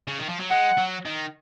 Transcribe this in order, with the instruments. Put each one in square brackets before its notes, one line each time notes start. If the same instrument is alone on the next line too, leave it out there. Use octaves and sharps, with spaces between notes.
[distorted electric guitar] C#3
D#3
F3
F#3
[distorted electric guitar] G#3 [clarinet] F#5
[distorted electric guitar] F#3
D#3